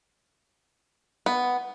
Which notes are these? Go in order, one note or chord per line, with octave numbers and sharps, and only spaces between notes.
B3